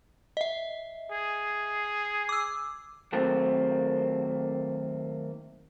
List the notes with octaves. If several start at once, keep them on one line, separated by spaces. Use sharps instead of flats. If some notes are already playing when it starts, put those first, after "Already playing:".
D#5 E5
G#4
D6 E6
D#2 F#3 A3 A#3 C4